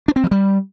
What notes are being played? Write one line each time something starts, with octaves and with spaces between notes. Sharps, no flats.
D4
C4
F3
G3